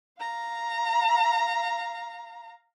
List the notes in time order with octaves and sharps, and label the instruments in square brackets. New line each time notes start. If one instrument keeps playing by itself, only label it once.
[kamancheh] F5 A#5